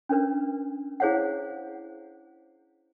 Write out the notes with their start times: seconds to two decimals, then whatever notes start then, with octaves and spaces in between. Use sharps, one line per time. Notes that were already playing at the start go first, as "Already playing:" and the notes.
0.09 C#4 D4 A#4 B4
1.00 E4 G#4 C5 C#5 F5 F#5